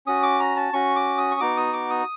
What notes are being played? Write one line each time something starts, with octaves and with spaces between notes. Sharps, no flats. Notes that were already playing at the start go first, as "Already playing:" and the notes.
C#4 F#4 D#6
D6
A#5
A5
C#4 F#4 C#6
D6
D#6
C#6
B3 D#4 F#4 D6
D#6
D6
D#6